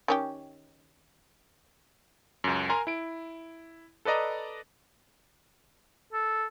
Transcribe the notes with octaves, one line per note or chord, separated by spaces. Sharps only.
D#3 C#4 G4
C#2 F#2
A#4 G#5 A#5 C6
E4 D7
A4 B4 D5 D#5 A#5
A4